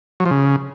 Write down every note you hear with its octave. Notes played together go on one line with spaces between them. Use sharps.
F#3
F3
C#3